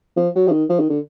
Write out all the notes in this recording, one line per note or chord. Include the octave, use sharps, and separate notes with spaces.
F3
F#3
F3
D#3
F3
D#3
D3